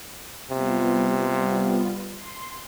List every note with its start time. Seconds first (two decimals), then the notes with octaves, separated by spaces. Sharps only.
0.51 C3 G3 B3 F4
2.11 C6